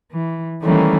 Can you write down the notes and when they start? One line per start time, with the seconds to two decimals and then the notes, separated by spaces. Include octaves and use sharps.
0.13 E3
0.63 D#3 E3 G3 A3 A#3 C#4